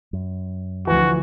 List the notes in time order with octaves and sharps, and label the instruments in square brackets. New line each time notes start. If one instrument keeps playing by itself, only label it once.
[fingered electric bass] F#2
[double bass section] D2 F3 [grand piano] E3 [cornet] F#4